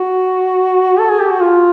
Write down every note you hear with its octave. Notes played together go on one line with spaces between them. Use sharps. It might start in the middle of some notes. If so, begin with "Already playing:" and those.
Already playing: F#4
A4
G#4
G4
F#4
F4